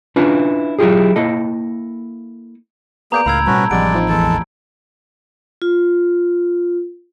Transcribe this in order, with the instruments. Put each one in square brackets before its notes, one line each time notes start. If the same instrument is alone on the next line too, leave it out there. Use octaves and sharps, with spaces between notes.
[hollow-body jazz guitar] C#4 D4 E4 F4 B4
F#3 E4 F4 G4 G#4
A#3 E4 A4 D#5
[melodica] A#3 G#4 [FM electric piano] B3 D5 [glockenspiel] A#5 G6 D7
[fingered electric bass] C#2 [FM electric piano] A2 [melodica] A#4 F5 [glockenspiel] B5 E6 G#6
[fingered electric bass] B2 G3 [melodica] C#4 F#4 B4 [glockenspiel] A5
[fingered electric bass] A1 F3 [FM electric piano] C3 G3 F#5 [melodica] G#3 D5 [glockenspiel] D7
[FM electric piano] C4 D#4 F4
[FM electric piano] B1 E2 E3 [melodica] G#3 A4 A5
[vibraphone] F4